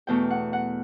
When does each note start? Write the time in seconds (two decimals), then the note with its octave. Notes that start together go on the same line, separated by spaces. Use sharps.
0.07 E2 B2 A3 G5
0.30 F#5
0.53 F#5